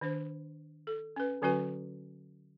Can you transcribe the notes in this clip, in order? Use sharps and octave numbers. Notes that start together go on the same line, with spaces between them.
D#3 D4 C5
A4
C#4 B4
D3 F#3 C#4 F#4 B4 G#5